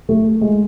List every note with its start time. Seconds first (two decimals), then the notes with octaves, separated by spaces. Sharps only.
0.09 A3
0.41 G#3